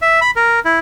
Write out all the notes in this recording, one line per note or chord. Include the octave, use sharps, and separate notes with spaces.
E5
B5
A#4
E4